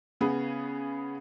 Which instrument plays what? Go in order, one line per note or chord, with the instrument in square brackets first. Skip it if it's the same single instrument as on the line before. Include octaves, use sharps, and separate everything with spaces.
[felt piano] C#3 B3 G#4